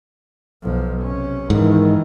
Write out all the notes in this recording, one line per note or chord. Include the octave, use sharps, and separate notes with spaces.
B1 F3
C3 C#4
G#2 D#3 E3